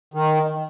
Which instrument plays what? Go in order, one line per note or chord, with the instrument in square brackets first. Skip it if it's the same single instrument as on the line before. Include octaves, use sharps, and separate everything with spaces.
[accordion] D#3